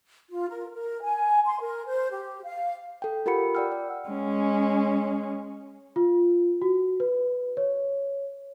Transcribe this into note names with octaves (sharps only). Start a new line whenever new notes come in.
F4
A#4
A#4
G#5
C6
A#4
C5
G4
F5
A4 G5
F4 G4 A#4 F#5 B5 C#7
D5 F#5 G5 E6 F6
D5
G#3 C#4
F4
F#4
B4
C#5